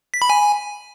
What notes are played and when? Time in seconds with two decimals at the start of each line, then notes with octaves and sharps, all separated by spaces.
0.14 B6
0.22 B5
0.30 G#5